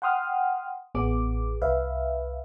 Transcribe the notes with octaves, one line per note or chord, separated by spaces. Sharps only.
F#5 G5 C6 D#6 F6
A1 B3 G#4 D6
C2 B4 E5 F5